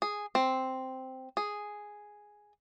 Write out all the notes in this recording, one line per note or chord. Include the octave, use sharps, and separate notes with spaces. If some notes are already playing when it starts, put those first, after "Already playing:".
G#4
C4
G#4